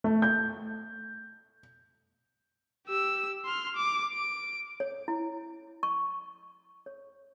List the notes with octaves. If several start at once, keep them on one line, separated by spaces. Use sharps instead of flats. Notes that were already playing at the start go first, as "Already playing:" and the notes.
A3
G6
G4 E6
C6 F6
D6
D7
C#5
E4
C#6
C#5